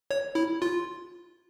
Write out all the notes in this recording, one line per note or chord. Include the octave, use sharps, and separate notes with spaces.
C#5
E4
F4